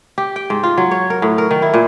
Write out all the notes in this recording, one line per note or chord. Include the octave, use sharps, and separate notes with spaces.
G4
G5
G#2
F4
F#3
C#5
A#4
A2
A#4
D#3
E4
A#2